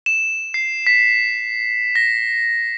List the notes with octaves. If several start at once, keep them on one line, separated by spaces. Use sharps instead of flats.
E7
C7
B6
A#6